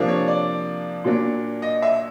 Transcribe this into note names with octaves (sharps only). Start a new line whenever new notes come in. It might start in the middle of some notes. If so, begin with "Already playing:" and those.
Already playing: C3 F3 A#3 D4
C#5
D5
A#2 F#3 A#3 D4
D#5
E5